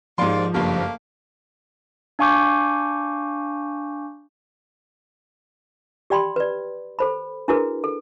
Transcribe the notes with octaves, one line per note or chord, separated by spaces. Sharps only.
D#2 G#2 F3 F4 D5 C6
F#1 G2 A3 A#3
D4 F5 G#5 C#6 D6 G6
G4 D5 G5 B5 C6
B4 D5
A4 C5 B5
D4 E4 F#4 G#4 A#4 B4
A4